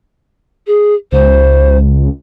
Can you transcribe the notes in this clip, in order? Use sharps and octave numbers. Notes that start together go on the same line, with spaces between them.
G#4
C#2 C5